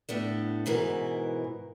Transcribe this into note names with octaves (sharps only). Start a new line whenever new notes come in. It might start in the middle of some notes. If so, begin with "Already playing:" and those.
A2 B3 D4
G#2 B2 E3 A#4